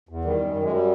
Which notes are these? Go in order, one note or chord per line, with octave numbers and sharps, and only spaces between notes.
E2
D#3 G3
F#2
F#2
G#3
F#3 G3